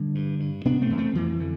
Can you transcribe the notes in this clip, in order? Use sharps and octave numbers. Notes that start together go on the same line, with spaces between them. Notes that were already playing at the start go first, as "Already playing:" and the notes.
Already playing: D3 G3
G2
G2
C3 B3 D4
A3 C4
E2
A3 C4
F2 E3
D3